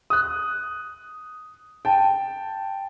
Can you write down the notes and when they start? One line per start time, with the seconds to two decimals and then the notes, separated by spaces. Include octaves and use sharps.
0.10 D#6 F#6
1.85 G5 A5